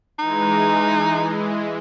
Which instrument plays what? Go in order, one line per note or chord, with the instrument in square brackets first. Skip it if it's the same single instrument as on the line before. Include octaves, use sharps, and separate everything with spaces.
[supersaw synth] E3 G#3 [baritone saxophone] D#4